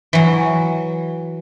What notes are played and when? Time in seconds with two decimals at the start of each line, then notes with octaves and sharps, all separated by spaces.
0.13 E3 F#3